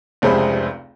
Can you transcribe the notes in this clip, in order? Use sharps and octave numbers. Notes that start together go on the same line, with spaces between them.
F1 C#2 C3 C4 G#4 B5